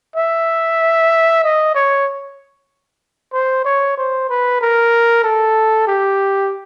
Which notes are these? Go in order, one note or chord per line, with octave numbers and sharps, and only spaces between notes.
E5
D#5
C#5
C5
C#5
C5
B4
A#4
A4
G4